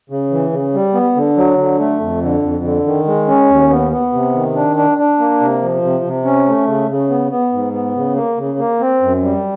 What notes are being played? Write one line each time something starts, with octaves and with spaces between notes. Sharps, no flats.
C#3
E3
C#3
G3
B3
D3
F#3
D3
A3
F2
D3
F2
D3
D#3
G#3
C#4
D#2
B3
B3
C3
D#3
D4
D4
D4
A#3
C3
F3
C3
C3
C#4
A3
C#3
C#3
B3
B3
G#2
B3
C#3
A#3
C#3
A#3
C4
F#2
G3